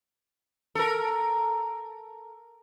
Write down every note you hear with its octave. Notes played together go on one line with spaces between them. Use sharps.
A4 A#4